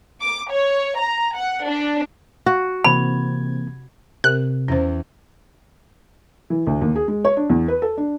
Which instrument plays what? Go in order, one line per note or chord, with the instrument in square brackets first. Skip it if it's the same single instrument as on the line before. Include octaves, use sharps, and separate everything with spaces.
[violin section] D6
C#5
A#5
F#5
D4
[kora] F#4
[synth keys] C3 G#6 [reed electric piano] E3 A#3 C4 [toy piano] B5
[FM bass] C3 [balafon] A#4 [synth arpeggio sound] F#6
[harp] E2 [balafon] C#4 C5
[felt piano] E3
D2
D#2
G#4
G#3
C#5
D4
E2
B4
A4
D4